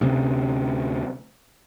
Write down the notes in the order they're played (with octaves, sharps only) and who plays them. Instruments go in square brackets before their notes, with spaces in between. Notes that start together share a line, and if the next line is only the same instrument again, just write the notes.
[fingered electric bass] D2 C3 C4 C#4